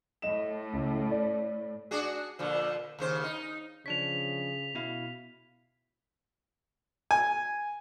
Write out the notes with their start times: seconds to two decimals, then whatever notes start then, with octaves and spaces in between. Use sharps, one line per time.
0.22 A2 D#5 E7
0.73 C#2
1.11 D5
1.91 D4 F#4 G#4
2.39 A#2 D3 F3
2.99 D#2 C#3 C5
3.24 D#4
3.86 C#3 F3 D4 C#5 B6 F7
4.75 B2 E4 F5
7.11 G#5